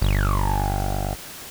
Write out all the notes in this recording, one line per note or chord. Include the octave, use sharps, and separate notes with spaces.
G1